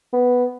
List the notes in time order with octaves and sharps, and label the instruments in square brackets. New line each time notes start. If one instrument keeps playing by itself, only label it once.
[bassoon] B3